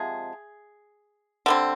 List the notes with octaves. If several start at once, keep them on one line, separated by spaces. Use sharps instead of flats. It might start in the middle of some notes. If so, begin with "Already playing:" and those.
Already playing: C3 F3 G#3 G#4
D3 G3 C4